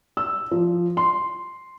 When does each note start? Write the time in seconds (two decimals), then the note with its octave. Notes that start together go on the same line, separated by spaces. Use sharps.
0.17 E6
0.51 F3
0.97 C6